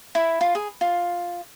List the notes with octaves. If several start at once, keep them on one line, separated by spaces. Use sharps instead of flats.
E4
F4
G#4
F4